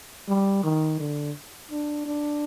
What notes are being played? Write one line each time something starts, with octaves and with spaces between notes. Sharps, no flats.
G3
D#3
D3
D4
D4